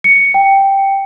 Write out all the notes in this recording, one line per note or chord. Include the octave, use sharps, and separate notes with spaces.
C#7
G5